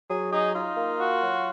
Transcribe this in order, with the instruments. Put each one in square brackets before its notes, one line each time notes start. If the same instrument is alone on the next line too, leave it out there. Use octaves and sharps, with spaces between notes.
[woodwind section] F#3 [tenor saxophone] G#4
[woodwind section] D#4 [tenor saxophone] G#4
[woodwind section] D#4 [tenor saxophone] F4
[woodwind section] A#3
F#4
F#3